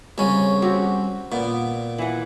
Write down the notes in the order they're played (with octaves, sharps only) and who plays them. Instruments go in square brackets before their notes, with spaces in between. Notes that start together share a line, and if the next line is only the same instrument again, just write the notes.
[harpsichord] C2 C#4 [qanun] C#3
[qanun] C4 F#4 G4
[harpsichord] A#2 [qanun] B3
[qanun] E3 F#5